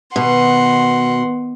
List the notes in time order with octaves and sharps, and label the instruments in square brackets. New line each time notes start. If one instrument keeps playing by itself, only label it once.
[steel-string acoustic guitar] B2 [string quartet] D#3 F#5 C6